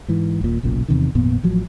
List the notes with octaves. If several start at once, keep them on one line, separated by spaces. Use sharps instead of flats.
G#2 E3
D#1 A#2
F#1 B1 F#2 A#2
E2 C3 D#3
G#1 F2 A#2 B3
A1 F3 F#3